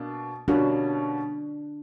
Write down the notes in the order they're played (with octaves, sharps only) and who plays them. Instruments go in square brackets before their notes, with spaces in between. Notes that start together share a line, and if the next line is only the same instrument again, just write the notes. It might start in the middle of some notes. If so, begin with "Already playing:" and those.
Already playing: [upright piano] B2 A#3 D4
[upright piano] B2 G3 A#3 C#4 F#4 [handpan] D4